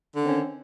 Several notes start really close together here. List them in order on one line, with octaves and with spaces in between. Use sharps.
D3 D#3 C4 C#4